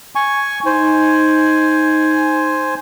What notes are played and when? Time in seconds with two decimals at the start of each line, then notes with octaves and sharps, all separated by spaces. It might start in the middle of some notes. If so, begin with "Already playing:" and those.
0.15 G#5 C#6
0.66 D#4 C5 G#5